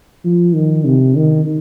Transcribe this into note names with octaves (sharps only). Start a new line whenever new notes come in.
F3
D#3
C3
D#3